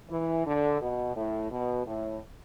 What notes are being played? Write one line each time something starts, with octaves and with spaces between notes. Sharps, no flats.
E3
D3
B2
A2
B2
A2